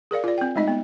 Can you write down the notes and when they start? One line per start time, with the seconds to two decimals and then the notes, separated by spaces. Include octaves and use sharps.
0.11 G#4 A#4 D5 F5
0.24 F4 D5
0.38 C4 G5
0.56 G#3 A3 D#4 D#5
0.68 B3